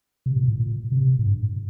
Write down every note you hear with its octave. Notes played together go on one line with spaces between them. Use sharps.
C3
A#2
A2
A#2
C3
A2
G2